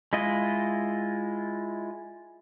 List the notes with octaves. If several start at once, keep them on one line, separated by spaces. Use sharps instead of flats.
G#3 E4 F4 D#5